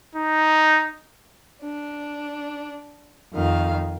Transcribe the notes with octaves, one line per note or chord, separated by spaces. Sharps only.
D#4
D4
F2 D#3 F5